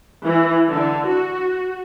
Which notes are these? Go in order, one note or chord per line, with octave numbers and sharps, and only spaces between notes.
E3
D3
F#4